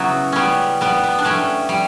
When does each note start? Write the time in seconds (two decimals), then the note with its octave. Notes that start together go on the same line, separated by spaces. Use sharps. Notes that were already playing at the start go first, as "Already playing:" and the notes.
Already playing: C#3 F#3 B3 C#4 E4
0.32 G3 B3 C#4
0.81 G3 B3
1.03 B3
1.19 D4
1.25 G3 A3 C#4
1.69 G3